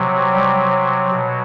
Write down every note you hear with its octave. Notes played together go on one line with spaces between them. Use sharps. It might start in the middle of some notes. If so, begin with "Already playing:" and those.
Already playing: C3 F#3
G3
F#3
B2 F#3